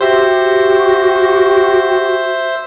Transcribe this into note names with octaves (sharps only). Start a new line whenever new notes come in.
F#4 G4 C5 E5